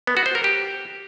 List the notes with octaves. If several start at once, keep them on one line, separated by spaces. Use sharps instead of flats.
B3
F#4
C5
A#4
G4